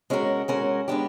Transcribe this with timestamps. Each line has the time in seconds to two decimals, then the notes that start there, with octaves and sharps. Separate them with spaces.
0.10 G#3 C#4 F#4 A#4
0.48 G#3 C#4 F#4 A#4
0.88 G#3 B3 D4 G4